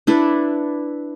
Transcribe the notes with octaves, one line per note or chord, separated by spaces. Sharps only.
D4 E4 A4 B4